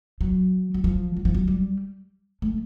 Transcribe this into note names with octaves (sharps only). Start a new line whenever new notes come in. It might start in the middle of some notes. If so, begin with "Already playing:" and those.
F#3
F#3
F3
F#3
F3
F#3
G3
A3